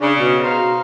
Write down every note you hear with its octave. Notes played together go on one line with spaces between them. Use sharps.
C#3 D4
B2
D#4 C5 F5